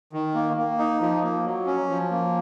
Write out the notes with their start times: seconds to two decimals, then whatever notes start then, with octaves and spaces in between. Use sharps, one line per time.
0.13 D#3
0.34 A#3
0.57 A#3
0.79 D#4
1.01 F3
1.23 A#3
1.45 F#3
1.66 C#4
1.89 F3
2.11 A#3